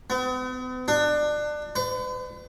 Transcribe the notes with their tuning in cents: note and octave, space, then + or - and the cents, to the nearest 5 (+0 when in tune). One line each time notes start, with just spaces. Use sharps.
B3 +45
D4 +25
B4 +45